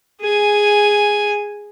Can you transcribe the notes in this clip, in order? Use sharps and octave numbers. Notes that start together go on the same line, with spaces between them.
G#4 G#5